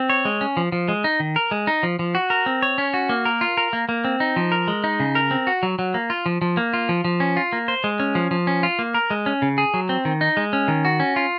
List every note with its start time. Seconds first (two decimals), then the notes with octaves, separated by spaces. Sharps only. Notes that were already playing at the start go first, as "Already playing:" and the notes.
Already playing: C4
0.10 C#5
0.25 G#3
0.41 C#4
0.57 F3
0.72 F3
0.88 G#3
1.04 D#4
1.20 D#3
1.36 A#4
1.51 G#3
1.67 D#4
1.83 F3
1.99 F3
2.15 F#4
2.30 A#4
2.46 C4
2.62 C#5
2.78 C#4
2.94 F#4
3.09 A#3
3.25 A#4
3.41 F4
3.57 A#4
3.73 A#3
3.89 A#3
4.05 C4
4.20 D#4
4.36 F3
4.52 A#4
4.68 G#3
4.84 D#4
5.00 C#3
5.15 A#4
5.31 C4
5.47 F#4
5.63 F#3
5.79 F#3
5.94 A#3
6.10 F4
6.26 F3
6.42 F3
6.57 A#3
6.73 F4
6.89 F3
7.05 F3
7.20 C#4
7.37 F4
7.53 A#3
7.68 C5
7.84 G#3
8.00 C#4
8.15 F3
8.31 F3
8.47 C#4
8.63 F4
8.79 A#3
8.94 A#4
9.10 G#3
9.26 C#4
9.42 C#3
9.58 G#4
9.74 F#3
9.89 C4
10.05 D#3
10.21 D#4
10.37 G#3
10.53 C#4
10.68 D#3
10.85 F#4
11.00 C#4
11.16 F4